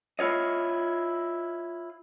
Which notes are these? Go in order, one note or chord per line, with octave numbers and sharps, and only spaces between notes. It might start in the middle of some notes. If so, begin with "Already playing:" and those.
E4 F4 C#5 D#5